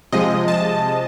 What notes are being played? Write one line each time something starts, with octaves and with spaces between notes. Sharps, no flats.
C3 F3 G#3 D#5
A5